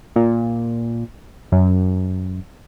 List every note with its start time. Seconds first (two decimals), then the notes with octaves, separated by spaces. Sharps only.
0.16 A#2
1.52 F#2